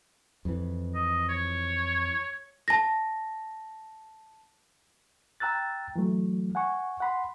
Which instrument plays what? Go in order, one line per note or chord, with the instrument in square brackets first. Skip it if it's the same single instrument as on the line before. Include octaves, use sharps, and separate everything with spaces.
[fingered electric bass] F2 E3
[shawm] D#5
C#5
[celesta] A5 A#6
[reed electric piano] G5 A#5 E6 F#6 A6
E3 F#3 A3
F#5 G#5 C#6
F#5 B5 C6